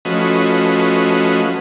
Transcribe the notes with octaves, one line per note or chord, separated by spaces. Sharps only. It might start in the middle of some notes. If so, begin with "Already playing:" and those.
F3 A3 C#4 F#4 B4 D#5